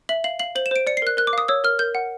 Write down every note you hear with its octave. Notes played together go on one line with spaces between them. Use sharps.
E5 F#7
F5 F#7
F5 F#7
C5 F#7
E7
C5 D7
D5 C#7
C7
A#4 F#6
A#4 F#6
D6
F5 D#6
C#5 E6
A#4 F6
A#4 G6
F#5